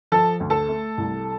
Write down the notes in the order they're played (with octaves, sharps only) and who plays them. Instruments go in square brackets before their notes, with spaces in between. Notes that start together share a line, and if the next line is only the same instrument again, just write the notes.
[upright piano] F3 A4 A5
D2
A4 A5
A3
C2